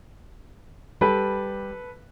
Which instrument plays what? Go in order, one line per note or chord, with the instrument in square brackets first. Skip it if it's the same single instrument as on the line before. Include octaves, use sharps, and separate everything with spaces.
[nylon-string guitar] G3 [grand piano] A4 B4 B5